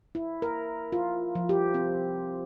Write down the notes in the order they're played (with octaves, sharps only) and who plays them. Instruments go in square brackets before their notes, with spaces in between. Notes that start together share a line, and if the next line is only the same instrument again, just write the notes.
[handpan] E4
A#4
F4
F3
G4
C4